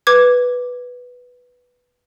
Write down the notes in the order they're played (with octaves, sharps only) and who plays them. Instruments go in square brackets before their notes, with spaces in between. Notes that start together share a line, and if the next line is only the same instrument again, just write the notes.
[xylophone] B4 D6 G#6